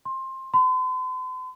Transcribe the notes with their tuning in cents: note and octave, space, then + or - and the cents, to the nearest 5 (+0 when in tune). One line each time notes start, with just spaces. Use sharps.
C6 +20
C6 -45